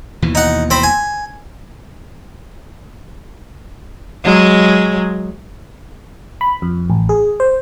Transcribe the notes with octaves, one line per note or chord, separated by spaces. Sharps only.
D#2 B2 E3
D#4 F#5
C4 C5 B5
G#5
F#3 G#3
B5
F2
A1
G#4
C5